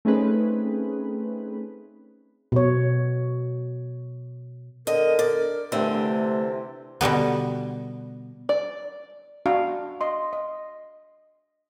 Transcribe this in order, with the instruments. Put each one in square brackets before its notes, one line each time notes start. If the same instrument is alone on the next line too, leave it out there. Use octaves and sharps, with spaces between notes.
[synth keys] A3 C4 C#4 D#4 G#4 B4
[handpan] B2 C#5
[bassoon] D3 [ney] A#4 [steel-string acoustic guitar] D#5
[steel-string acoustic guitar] D5
[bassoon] G2 [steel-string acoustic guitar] D3 E3 C4 [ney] A3
[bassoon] C3
[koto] B2 D3 G3 B3
[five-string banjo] D5
[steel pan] D4 F#4 F5
D#5 C6
D#5